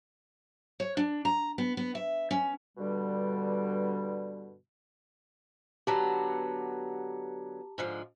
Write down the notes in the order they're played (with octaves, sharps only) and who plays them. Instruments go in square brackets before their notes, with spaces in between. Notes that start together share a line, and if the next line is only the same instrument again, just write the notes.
[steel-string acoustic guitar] C#5
D4
A#5
B3
B3
E5
C#4
[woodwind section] G2 B2 D3 G3
[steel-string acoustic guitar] D3 F#3 B3 [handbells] G4 A5 A#5
[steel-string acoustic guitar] G#2 D3 F3